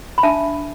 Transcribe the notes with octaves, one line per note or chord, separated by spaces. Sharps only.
B5
D4 E5 A5